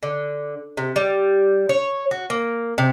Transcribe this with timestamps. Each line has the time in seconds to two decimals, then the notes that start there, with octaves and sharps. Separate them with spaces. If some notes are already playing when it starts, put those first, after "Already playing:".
0.03 D3
0.77 C3
0.96 G3
1.69 C#5
2.11 F#4
2.30 A#3
2.78 C3